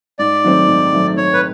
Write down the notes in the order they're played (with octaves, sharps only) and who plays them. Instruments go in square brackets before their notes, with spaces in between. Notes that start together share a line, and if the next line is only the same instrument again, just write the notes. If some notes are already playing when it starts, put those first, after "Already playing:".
[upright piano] G#2 [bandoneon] D5
[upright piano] D#3 F#3 A3 C4
G#2
D#3 F#3 A3 C4
[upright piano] G#2 [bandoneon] C#5
[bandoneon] B4